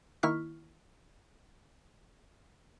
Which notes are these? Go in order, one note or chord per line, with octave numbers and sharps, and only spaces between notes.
D#3 A#3 E4 C#6 F6 B6